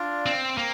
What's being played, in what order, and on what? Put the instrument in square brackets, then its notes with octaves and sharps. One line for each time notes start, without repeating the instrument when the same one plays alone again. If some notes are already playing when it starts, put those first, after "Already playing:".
Already playing: [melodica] D4 F4 D5 F5
[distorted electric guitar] C4
[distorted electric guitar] A#3 [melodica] C4